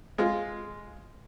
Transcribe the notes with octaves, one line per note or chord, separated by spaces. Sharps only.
G#3 F4